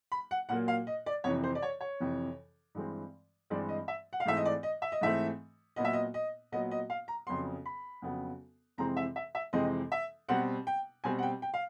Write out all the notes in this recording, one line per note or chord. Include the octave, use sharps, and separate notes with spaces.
B5
F#5
A#2 F#3 A#3 F#5
F5
D#5
D5
F2 C3 E3 C#5
C5
D5
C#5
C#5
F2 C3 E3
G2 E3 G#3 C4
G2 E3 G#3 C4 D5
D#5
E5
F#5
F5
G#2 E3 A3 C4 E5
D#5
D5
D#5
E5
D#5
G#2 E3 A3 C4 E5
A#2 F#3 B3 D#5
E5
D#5
D#5
A#2 F#3 B3 D#5
D#5
F5
A#5
F2 C#3 F#3 B3 C6
B5
F2 C#3 F#3 B3
F2 C3 E3 G#3 C4 A#5
E5
E5
E5
F2 C3 E3 G#3 C4 D#5
E5
B2 G3 C4 F#5
G5
B2 G3 C4 G#5
F#5
G5
G5
F5